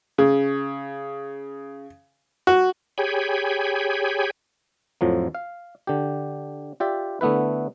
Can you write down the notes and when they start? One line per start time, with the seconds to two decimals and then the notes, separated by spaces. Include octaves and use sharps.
0.18 C#3
2.47 F#4
2.98 G4 G#4 C#5 G5 G#5 B5
5.01 F2 A2 F3 F#3
5.35 F5
5.87 D3 G4
6.80 F4 G4 D5 E5
7.21 D3 A3 B3 E4 B4